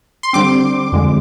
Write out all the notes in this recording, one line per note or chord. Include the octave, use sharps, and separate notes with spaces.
C6
D3 G3 C4 D6
F2 D3 G#3